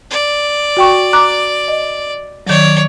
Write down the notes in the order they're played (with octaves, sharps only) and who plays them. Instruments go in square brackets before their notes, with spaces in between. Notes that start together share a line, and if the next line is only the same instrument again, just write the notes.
[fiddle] D5
[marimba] F#4 G5 C#6
A#5 D6 F#6
D#5
[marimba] D#3 F#3 [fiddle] C#5 D5